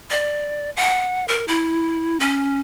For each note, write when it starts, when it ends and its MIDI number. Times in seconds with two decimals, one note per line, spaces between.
0.10 0.70 74
0.77 1.25 78
1.28 1.45 70
1.48 2.18 64
2.20 2.60 61